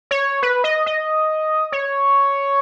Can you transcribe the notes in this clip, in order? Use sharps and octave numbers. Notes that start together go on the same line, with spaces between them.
C#5
B4
D#5
D#5
C#5